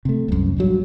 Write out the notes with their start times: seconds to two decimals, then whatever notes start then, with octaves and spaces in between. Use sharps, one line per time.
0.05 C3 A3
0.28 C2 F#2
0.57 A#1 G2 F#3